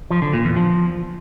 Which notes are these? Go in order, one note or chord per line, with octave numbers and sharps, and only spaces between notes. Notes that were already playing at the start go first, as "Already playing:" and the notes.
F3
D3
A#2
E2
F3